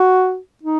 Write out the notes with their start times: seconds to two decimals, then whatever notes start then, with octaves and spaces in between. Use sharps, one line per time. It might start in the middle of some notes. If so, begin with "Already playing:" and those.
Already playing: F#4
0.63 D#4